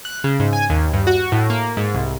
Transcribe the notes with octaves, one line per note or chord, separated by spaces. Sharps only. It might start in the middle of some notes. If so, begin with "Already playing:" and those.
F#6
C#3
G#2
G#5
D#2
G2
F#4
A2
A#3
G#2
C2